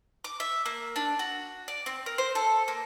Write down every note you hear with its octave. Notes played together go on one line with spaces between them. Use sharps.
D6
E5
A#3
D4
F#4
D5
C4
A#4
C5
A4
A#3